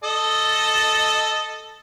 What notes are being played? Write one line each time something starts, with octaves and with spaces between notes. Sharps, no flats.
A4 D#5